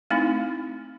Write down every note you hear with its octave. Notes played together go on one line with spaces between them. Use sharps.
A3 C4 D#4 E4